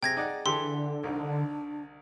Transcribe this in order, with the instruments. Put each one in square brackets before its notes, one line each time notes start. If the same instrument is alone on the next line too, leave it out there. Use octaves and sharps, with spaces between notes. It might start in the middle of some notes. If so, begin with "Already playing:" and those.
[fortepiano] C3 [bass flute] G#4 [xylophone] G5 G#6 A#6
[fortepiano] D#4 D5 F#5
[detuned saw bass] D3 [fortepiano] E3 G4 A4 [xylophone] C6
[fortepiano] C2 D#3 [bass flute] D4